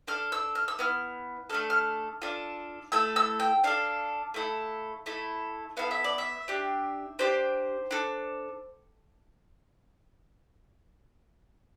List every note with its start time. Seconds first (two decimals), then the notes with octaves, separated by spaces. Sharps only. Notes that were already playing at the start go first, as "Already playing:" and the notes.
0.07 D4 A4 F6
0.32 E6
0.55 F6
0.68 E6
0.79 B3 E4 F6
1.50 A3 D4 A4 F6
1.70 F6
2.22 D4 F4 A4
2.92 A3 E4 A4 E6
3.16 E6
3.40 G5
3.64 D4 A4 F5
4.34 A3 E4 A4
5.06 A3 E4 A4
5.77 B3 E4 A4 F5
5.91 E5
6.04 D5
6.18 E5
6.48 D4 G4
7.19 D4 G4 C5
7.91 D4 A4